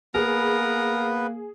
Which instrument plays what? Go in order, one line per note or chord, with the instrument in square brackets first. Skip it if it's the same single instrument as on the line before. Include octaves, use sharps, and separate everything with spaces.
[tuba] A#3 [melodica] B3 B4 [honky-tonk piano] G#4 [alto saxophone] A#4